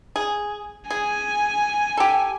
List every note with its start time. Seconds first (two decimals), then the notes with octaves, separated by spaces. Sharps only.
0.16 G#4
0.90 G#4 G#5
1.97 G4 A4